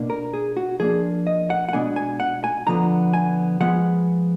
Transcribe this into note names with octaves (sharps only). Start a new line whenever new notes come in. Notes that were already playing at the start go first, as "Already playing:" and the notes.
Already playing: B2 A#3 D4
A#4
G#4
F#4
F3 A#3 D4 G#4
D#5
F#5
F#5
B2 G#3 B3 D4 G#5
G#5
F#5
G#5
D3 F3 B3 A#5
G#5
F3 G#3 B3 F#5